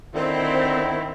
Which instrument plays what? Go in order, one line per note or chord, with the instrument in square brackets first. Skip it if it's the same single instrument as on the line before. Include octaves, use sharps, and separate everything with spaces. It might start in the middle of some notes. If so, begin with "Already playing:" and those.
[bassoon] D3 [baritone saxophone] D#3 [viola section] C4 [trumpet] E4